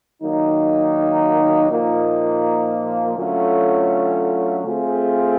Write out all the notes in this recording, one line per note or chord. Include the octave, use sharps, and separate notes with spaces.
D#3 F#3 A#3 D#4
A#2 F3 A#3 D#4
D3 F#3 A3 C#4 F4
A3 C4 F4 G#4